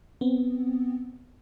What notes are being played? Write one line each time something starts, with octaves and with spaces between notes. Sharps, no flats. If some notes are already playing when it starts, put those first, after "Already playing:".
B3 C4